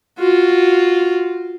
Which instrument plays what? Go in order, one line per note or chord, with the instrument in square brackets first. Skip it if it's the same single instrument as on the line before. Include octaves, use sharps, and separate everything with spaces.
[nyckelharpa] F4 F#4